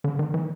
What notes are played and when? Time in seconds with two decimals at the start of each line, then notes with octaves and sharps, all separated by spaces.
0.04 D3
0.19 D#3
0.34 E3